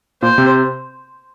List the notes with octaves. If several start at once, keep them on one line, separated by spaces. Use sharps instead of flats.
A#2 A#3 C5
C3 C4